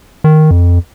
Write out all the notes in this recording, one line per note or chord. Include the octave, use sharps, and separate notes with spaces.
D#3
F2